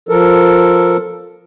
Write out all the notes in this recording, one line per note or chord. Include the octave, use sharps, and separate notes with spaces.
F3 A4 A#4